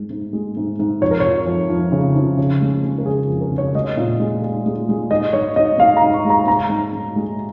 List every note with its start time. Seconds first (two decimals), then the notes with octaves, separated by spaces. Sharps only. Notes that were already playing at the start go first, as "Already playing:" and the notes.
Already playing: G#2 G#3
0.10 G#2
0.33 G#3
0.57 G#2
0.79 G#2
1.01 F2 C#5
1.11 A#4
1.20 F3 C#5
1.47 F2
1.69 F3
1.92 C#3
2.16 F3
2.38 C#3
2.61 G#3
2.84 G#3
2.98 A#4
3.06 C#3 G#4
3.28 F2
3.41 A#4
3.52 C#3
3.58 C#5
3.74 G#3 D#5
3.97 A#2
4.19 G#3
4.42 G#3
4.66 G#3
4.89 G#3
5.11 G#2 D#5
5.33 G#2 C#5
5.56 G#2 D#5
5.79 G#2 F5
5.97 A#5
6.02 G#2
6.14 C#6
6.25 G#3
6.30 A#5
6.47 G#2 A#5
6.69 G#2
6.93 G#2
7.16 G#3